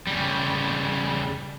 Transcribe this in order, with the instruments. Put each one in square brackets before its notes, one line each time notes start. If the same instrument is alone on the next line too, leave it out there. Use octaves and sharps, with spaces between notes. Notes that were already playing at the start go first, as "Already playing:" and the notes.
[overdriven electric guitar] C#3 G3